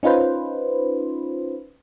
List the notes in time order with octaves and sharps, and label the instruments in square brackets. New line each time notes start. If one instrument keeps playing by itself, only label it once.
[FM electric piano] C#4 D#4 F4 B4 C5